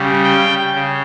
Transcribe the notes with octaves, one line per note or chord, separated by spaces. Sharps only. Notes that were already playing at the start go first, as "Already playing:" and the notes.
Already playing: C#3 G3
G5
C#3